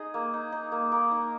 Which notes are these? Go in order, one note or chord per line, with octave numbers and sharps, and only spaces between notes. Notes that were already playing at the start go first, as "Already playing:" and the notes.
Already playing: D#4 G#4
A#3
D#4
D#4
A#3
A#3
D#4